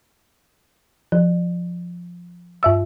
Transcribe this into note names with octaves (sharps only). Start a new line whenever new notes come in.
F3
G2 E5 E6